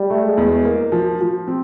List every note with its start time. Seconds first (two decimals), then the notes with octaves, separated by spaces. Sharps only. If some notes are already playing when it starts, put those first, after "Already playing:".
Already playing: G3
0.10 A3
0.24 G#3
0.37 E2
0.65 A#3
0.92 F3
1.21 F3
1.47 C4